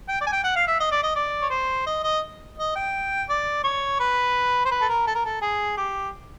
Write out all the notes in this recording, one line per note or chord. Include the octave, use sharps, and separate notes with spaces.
G5
D5
G#5
G5
F#5
F5
E5
D#5
D5
D#5
D5
C#5
C5
D#5
D#5
D#5
G5
D5
C#5
B4
C5
B4
A4
A#4
A4
A#4
A4
G#4
G4